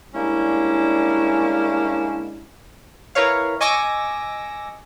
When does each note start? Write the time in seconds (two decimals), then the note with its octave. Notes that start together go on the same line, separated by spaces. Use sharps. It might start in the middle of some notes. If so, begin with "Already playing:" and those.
0.14 G3 G#3 A#3 C#4 D4 E4
3.15 E4 A#4 B4 C#5 F5
3.61 D#5 G#5 C#6 D6 E6 A#6